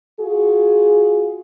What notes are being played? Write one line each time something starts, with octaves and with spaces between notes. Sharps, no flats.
F4 F#4 G#4